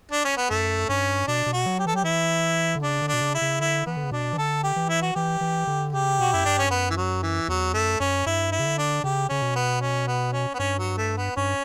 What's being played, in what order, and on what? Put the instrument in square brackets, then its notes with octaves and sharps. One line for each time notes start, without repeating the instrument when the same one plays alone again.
[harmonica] D4
C#4
B3
[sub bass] F#2 [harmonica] A3
[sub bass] G2 [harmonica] C#4
[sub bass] B2 [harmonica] D4
[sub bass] B2
[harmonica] F#4
[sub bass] F#3
[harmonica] G4
[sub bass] E3 [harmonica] A4
[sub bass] F#3 [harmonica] G4
[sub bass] E3 [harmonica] E4
[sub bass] D3
[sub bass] C#3 [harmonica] D4
[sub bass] D3
[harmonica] D4
[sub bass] B2
C#3
[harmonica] E4
[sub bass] C#3
[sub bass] D3 [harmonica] E4
[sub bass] E3 [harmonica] B3
[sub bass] D3
C#3
[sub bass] B2 [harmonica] D4
[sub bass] E3
[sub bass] D3 [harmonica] A4
[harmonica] G4
[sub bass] E3
[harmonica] E4
F#4
[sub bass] E3 [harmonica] G4
[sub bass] E3
D3
[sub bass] C#3 [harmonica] G4
[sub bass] B2 [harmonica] F#4
[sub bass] F#2 [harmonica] E4
[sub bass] G2 [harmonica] D4
[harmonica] C#4
[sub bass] F#2 [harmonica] B3
[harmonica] E3
F#3
E3
[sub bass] E2 [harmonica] F#3
[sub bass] F#2 [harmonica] A3
[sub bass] F#2 [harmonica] C#4
[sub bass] G2 [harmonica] E4
[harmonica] E4
[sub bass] C#3
D3
[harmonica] D4
[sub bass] C#3 [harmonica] G4
[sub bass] C#3 [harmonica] C#4
[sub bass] B2
[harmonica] B3
C#4
B3
C#4
B3
[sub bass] G2 [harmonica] C#4
[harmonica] F#3
A3
B3
[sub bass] G2 [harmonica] C#4